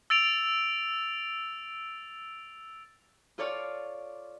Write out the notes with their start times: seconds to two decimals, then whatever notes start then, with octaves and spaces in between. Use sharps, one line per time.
0.10 E6 A6 D7 F7
3.38 F4 A4 C#5 D5 F5